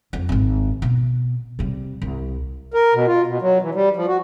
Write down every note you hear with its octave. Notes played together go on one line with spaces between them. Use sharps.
F2
G#1 C4
B2
C3 G3
C2
A#4
B2
F4
B2
F#3
E3
G3
F3
F#4